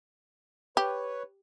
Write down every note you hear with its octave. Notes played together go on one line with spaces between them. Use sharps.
G4 B4 C#5